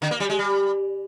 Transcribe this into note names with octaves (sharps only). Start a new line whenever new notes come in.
D3
A#3
G3
G#3
G3